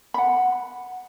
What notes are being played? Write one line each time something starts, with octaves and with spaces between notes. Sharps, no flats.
F#5 B5